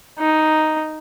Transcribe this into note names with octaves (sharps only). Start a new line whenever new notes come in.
D#4